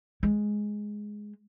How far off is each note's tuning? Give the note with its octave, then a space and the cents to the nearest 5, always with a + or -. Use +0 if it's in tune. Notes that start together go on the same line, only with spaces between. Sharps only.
G#3 +5